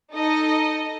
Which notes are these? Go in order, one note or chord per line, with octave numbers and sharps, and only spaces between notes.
D#4 A4 D#5